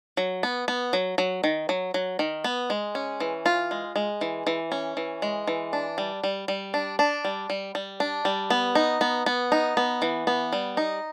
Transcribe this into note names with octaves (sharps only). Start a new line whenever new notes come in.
F#3
B3
B3
F#3
F#3
D#3
F#3
F#3
D#3
B3
G#3
C#4
E3
F4
G#3
G#3
E3
E3
C#4
E3
G#3
E3
D4
G3
G3
G3
D4
D4
G3
G3
G3
D4
G3
B3
D#4
B3
B3
D#4
B3
E3
B3
G3
D#4